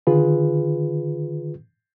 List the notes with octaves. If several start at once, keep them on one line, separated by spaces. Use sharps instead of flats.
D3 D#3 F4 G#4 B4